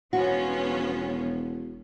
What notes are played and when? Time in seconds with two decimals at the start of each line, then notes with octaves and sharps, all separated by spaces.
0.13 E1 F3 B3 C#4 F#4